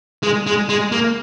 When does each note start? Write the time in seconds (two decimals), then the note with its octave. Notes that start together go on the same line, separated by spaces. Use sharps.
0.23 G#3
0.47 G#3
0.69 G#3
0.92 A#3